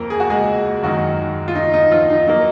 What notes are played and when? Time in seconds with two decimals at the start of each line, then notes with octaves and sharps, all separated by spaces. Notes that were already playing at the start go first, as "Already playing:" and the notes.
Already playing: F2 A#3 A#4
0.10 G#4
0.20 F#4
0.30 G#3 G#4
0.82 F#2 D#3 F#3 G#3 F#4
1.48 F4
1.55 D#4
1.74 D#4
1.91 F3 F4
2.10 D#4
2.27 F#3 A#3 D#4